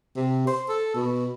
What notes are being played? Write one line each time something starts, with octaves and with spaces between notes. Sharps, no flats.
C3
C5
A4
B2